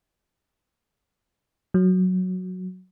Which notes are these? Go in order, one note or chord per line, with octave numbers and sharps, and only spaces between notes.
F#3